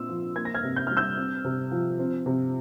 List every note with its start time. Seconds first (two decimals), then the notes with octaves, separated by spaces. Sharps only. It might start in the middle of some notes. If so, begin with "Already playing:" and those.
Already playing: A#2 C4 C6 E6
0.09 F3
0.35 A#3 G#6
0.45 A#6
0.54 F6 G#6
0.63 C3
0.76 G6
0.87 G3 F6
0.97 E6 G6
1.17 C4
1.44 C3
1.72 F3
1.99 C4
2.26 C3